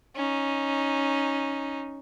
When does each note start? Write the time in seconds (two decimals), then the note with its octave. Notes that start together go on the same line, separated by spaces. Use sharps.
0.16 C#4 D#4